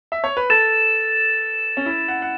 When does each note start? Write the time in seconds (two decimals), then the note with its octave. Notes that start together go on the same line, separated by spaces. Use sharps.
0.12 E5
0.24 C#5
0.37 B4
0.50 A4 A6 E7
1.77 C#4
1.86 E4
2.08 F#5
2.22 F#5